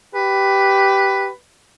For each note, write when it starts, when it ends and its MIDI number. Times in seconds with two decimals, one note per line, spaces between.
0.15 1.30 67
0.15 1.32 71